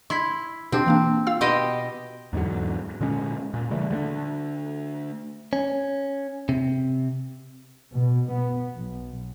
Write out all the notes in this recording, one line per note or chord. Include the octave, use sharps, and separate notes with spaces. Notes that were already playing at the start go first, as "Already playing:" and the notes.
E4 C6 G#6 B6
B2 C4 D4 G4
E3 A#3 D4
F4 F5 E6
B2 G4 D#5 B5 C6
E2 G#2 D3 F#3
A#2 D3 G#3 C#4
A#2
C#3 E3 G3 A3
D3 A3 A#3 D4
C#4
C3
B2
B3
B1